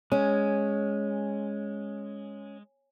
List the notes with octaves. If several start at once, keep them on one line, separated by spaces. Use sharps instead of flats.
G#3 C#4